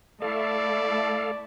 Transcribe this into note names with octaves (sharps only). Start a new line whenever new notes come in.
A3 E4 A4 D5 F5 A5